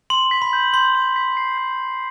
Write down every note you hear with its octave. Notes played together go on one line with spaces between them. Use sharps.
C6 F#7
B6
B5
G6
C6 G6
F#7
B6
C7
G6